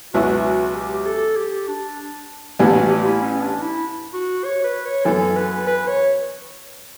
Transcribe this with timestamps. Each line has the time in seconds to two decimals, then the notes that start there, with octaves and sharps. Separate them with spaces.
0.14 C#2 B2 F#3 B3 E4 F#4
0.75 G4
1.06 A4
1.36 G4
1.68 D4
2.59 A1 A2 E3 G3 B3 D4
2.75 F#4
2.90 G4
3.06 E4
3.21 C#4
3.41 D4
3.62 E4
4.13 F#4
4.44 C#5
4.64 B4
4.85 C#5
5.05 F#2 E3 B3 A4
5.36 B4
5.67 B4
5.87 C#5